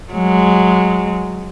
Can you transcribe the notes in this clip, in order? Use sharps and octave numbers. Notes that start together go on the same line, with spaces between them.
F#3 G#3